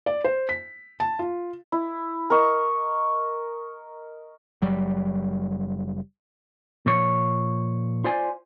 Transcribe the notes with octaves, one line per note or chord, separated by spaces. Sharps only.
D5
C5
B6
A5
F4
E4
A#4 D#5 C#6
F#1 F#3 G3
A#2 F3 C#5
F4 C5 D5 G#5